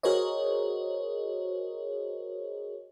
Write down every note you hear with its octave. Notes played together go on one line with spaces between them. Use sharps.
F#4 G#4 A#4 C5 C#5 D#5